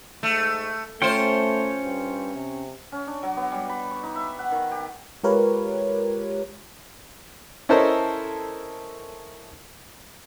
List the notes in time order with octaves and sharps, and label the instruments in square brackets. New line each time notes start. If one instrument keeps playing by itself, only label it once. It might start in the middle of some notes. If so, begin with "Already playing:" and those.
[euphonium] G#2 [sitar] A3
[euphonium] A3 [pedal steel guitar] C#4 C#5 G5 [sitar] F4 C5
[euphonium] G2
C3
[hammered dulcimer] C#4
D4
F#3
B3
G3
B5
C#6
D#4
E5
F#5
D#3
G4
[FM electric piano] G#3 F4 G4 A#4 B4 C#5
[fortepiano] C#4 E4 A4 A#4 C5 D#5